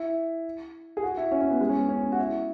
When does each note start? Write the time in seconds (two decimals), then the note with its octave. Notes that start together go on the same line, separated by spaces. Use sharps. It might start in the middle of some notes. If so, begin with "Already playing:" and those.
Already playing: E4
0.97 G#4
1.03 F#4
1.17 E4
1.32 C#4
1.42 C#4
1.51 B3
1.61 G#3
1.69 C#4
1.75 B3
1.89 C#4
2.12 F#4
2.18 E4